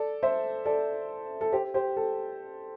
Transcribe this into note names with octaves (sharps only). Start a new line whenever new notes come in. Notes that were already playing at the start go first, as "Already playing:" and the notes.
Already playing: A4 D5
C5 E5
A4 D5
A4
G4 C5
G4 C5
A4